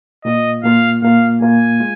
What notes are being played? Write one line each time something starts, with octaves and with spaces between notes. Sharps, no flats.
A#2 A#3 F4 D#5
A#2 A#3 F4 F5
A#2 A#3 F4 F5
A#2 A#3 F4 G#5
G#3 F4